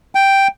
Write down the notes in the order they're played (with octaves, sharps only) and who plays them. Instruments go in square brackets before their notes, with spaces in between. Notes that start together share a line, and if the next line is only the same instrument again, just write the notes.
[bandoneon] G5